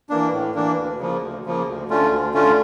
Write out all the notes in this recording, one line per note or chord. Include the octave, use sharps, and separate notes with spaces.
E3 A#3 D4
A2
E3 A#3 D4
D2
C#3 F3 A#3
D2
C#3 F3 A#3
D2
D3 A3 C#4 F4
D2
D3 A3 C#4 F4